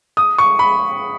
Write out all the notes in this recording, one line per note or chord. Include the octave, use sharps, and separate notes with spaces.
D#6
C#6
B5